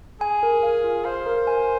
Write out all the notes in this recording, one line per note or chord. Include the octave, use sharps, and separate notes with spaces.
G#4 G#5
A#4
F5
F4
C5 F5
A#4
G#5